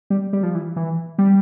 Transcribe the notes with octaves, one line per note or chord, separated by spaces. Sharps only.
G3
G3
F3
E3
E3
G3